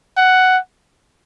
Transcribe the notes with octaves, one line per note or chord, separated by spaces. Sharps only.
F#5